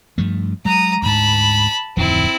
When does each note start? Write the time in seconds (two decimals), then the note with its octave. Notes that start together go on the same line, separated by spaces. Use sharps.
0.18 G2 F3 A3
0.65 F#3 G#3 A#5 D#6
1.02 D2 G#2 A5 B5
1.97 D1 F2 D#3 C4 E4